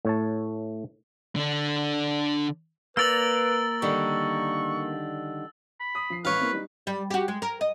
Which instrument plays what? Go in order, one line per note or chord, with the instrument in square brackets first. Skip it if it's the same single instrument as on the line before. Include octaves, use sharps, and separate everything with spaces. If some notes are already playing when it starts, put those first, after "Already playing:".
[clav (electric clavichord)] A2 C#5 A5
[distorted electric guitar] D3 D4
[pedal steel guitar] A#3 A#4 D5 [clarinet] B4 [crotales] E6 A6 F#7
[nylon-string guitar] D3 D#3 G3 [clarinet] C#6
[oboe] B5
[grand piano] D#6
F3 C7
[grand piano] A1 [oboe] B4 [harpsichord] C#5 F5
[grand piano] A#3 C4 E4
G3 D#4
[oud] G3
F#4 G4
G#3
A#4
D#5